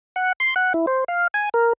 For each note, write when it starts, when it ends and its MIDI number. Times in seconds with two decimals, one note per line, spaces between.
0.16 0.32 78
0.40 0.54 84
0.56 0.73 78
0.74 0.86 64
0.87 1.04 72
1.08 1.27 77
1.34 1.49 80
1.54 1.73 70